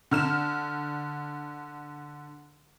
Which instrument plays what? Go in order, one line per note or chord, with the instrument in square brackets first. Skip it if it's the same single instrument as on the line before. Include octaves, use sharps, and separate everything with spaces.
[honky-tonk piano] D3 F6 E7